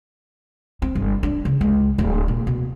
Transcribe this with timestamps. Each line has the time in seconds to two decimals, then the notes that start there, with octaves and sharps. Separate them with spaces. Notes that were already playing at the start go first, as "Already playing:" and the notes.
0.82 C4
0.95 G1
1.23 D4
1.45 C#3
1.61 C#2
1.98 D1
2.28 A#2
2.47 B2